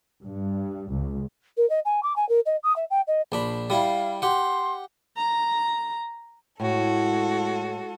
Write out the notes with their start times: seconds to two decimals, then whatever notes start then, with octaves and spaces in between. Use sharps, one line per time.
0.24 G2
0.91 C#2
1.57 A#4
1.70 D#5
1.85 G#5
2.03 D6
2.16 G#5
2.29 A#4
2.46 D#5
2.63 D#6
2.76 E5
2.90 G5
3.07 D#5
3.32 A#1 D4 B5
3.70 G3 E4 F5
4.22 G4 F#5 C6
5.17 A#5
6.60 A2 G#3 F#4 A4